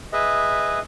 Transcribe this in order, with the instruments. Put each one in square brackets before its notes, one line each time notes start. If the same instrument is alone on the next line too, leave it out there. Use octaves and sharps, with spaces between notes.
[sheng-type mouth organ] G#4 B4 D#5 E5